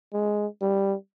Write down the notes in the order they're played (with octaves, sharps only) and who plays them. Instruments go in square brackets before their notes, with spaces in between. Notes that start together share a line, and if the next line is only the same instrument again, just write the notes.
[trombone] G#3
G3